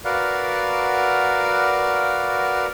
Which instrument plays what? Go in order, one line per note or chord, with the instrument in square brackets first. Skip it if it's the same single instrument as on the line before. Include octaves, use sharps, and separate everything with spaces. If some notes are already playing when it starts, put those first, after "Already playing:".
[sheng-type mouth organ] F#4 A#4 B4 D5 F5 F#5